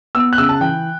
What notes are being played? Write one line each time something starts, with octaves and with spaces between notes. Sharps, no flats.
B3 E6
F#6
C#3 E6
A5
E3 G5